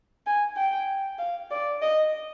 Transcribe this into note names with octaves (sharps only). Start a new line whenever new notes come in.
G#5
G5
F5
D5
D#5